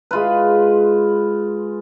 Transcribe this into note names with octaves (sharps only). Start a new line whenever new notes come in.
G#3 F4 B4